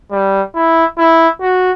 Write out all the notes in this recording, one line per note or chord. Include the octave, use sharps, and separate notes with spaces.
G3
E4
E4
F#4